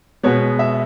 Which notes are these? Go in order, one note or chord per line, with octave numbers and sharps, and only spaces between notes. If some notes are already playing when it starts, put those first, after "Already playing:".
B2 G#3 B3 C#5
E5